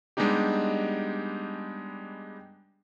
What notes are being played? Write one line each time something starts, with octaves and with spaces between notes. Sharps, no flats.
G3 G#3 B3 D4 D#4 G4